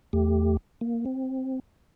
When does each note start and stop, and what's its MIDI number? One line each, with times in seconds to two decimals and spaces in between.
0.13 0.57 40
0.13 0.57 57
0.13 0.57 67
0.81 1.05 58
1.06 1.60 60